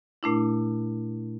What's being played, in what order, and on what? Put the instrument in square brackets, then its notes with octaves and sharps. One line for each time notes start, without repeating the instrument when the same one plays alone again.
[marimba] A#2 A3 D4 E4